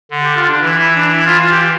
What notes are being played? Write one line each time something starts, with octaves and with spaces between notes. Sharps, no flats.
D3
G4
F4
D4
E3 E4
E4
D4
E4
F4
F4
G4